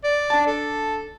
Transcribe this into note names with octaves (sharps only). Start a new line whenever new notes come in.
D5
D4 A5
A4